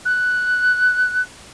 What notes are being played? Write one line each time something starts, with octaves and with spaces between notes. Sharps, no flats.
F#6